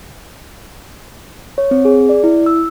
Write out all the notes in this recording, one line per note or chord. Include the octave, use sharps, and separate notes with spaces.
C#5
C4
G#4
D5
E4
E6